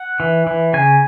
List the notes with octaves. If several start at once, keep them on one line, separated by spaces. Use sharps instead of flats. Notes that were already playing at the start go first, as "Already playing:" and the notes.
Already playing: F#5
E3
E3
C#3 G#5